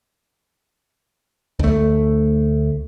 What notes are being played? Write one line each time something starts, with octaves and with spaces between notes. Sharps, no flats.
D2 A3